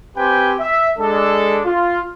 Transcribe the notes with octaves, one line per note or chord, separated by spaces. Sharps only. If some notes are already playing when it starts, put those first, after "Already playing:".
C4 G4 B4 C5 G5 G#5
E5
G#3 D4 A4
F4